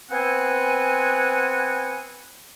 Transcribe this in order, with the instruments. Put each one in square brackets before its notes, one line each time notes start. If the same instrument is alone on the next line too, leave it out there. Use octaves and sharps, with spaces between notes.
[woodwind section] B3 C4 C5 F#5 G#5